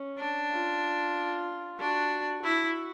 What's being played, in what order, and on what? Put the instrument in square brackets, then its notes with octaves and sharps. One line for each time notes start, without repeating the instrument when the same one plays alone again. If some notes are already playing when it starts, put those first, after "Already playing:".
Already playing: [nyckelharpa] C#4
[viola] D4
[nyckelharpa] F4
[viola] D4 [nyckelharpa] F#4
[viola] E4 [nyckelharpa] F#4